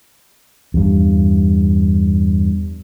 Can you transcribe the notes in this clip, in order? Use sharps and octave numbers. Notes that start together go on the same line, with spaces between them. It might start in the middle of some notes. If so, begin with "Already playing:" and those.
E2 G2